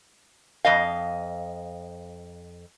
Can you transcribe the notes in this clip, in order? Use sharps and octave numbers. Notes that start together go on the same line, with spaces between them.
F2 D#5 F5